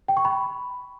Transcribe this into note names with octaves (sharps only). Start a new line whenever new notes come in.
G5
C#6
B5